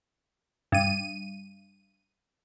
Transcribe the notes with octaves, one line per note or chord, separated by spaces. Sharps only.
G2 D#7